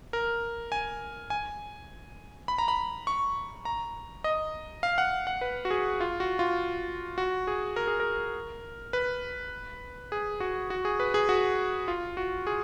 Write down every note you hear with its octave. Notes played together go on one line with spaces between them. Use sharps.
A#4
G#5
G#5
B5
A#5
B5
C#6
A#5
D#5
F5
F#5
F#5
B4
F#4
G#4
F4
F#4
F4
F#4
G#4
A#4
G#4
A#4
B4
G#4
F#4
F#4
G#4
B4
G#4
F#4
F4
F#4
G#4